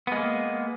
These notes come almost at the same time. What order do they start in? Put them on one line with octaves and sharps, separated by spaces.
B3 G#3 A#3